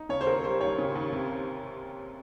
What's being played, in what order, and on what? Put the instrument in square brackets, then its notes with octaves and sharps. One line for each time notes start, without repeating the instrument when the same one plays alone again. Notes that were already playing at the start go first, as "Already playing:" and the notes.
Already playing: [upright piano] D#4
[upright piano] C#3 [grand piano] C#5
[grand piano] C5
[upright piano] D#2 [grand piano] A#4
[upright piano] G3 [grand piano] C5
[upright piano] D#2 [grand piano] C#5
[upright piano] C#3
D#2
C3